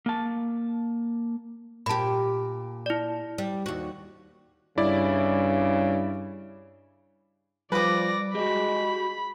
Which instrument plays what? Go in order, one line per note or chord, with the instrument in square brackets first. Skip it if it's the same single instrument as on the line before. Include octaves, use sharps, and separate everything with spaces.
[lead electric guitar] A#3 A5
[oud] A#2 G4 [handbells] A5 B5
[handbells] E4 D5
[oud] G3
D#2 F#4
[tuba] G2 [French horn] C#3 [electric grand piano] E4 D5
[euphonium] F3 [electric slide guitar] G3 [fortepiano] B4 D6 [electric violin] D5 A#6
[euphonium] G#3 [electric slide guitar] F#4 G4 [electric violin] B5